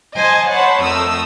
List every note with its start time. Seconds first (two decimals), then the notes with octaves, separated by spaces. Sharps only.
0.17 C5 D#5 G#5 A5
0.49 C5 C#5 F#5 A5 B5
0.82 F2 A3 A#4 D#6 E6